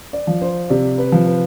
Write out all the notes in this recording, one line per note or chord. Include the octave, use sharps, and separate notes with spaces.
D5
F3
C5
C3 D5
B4
F3
B4